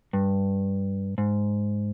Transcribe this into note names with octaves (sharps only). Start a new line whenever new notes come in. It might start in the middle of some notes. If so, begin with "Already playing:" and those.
G2
G#2